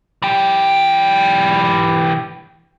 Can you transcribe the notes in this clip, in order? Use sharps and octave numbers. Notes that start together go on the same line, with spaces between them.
E3 G4